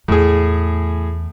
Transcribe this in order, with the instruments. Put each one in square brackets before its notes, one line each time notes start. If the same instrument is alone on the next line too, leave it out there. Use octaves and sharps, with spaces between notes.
[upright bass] E2 [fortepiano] A2 G#4